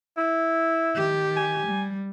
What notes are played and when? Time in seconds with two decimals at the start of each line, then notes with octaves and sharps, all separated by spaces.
0.17 E4
0.95 D#3 G4
1.36 G#5
1.67 G3